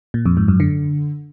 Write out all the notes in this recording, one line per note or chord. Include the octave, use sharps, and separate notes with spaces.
A#2
F2
G#2
F#2
D3